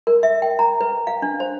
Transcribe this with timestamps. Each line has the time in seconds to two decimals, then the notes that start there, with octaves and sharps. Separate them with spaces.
0.07 A#4
0.23 E5
0.42 G5
0.59 A#5
0.81 B4
1.07 F5
1.22 D4
1.40 C5